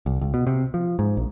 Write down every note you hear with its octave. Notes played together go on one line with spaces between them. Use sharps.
C2
C#2
B2
C3
F3
G#2
A#1